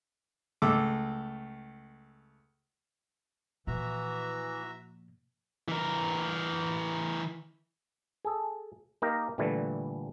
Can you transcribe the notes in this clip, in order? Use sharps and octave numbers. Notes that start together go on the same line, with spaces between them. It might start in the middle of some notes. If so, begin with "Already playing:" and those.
C#2 A3 D6 E6
A#2 E3 F3 F#4 E5 A#5
E3 A#4
G#4 A4
A#3 D#4 G4 A#4 A#5
A#2 D3 E3 G3 A3